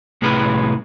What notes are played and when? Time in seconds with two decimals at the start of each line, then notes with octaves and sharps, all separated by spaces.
0.22 C2 A2 G#3 C#4 G#4 B4